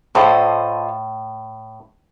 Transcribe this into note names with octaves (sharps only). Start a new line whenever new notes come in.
A2 F4 A4 C5 D#5